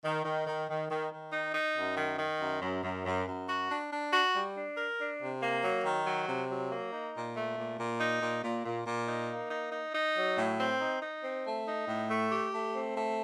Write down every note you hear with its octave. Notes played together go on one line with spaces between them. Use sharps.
D#3
D#3
D#3
D#3
D#3
D#3
D#4
D#4
F#2
D#3
D#3
F#2
F#2
F#2
F#2
F#2
F#4
D4
D4
F#4
G3
D4
A#4
D4
C3
A#3
F#3
D#3
F#3
C3
F#3
A#3
D#4
A#2
A3
A#2
A#2
D#4
A#2
A#2
A#2
A#2
D#4
A#3
D#4
D#4
D#4
F#3
A2
C4
D#4
D#4
C4
A3
D#4
A2
A3
G4
A3
C4
A3